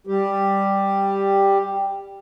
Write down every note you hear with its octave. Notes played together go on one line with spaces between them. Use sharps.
G3 G4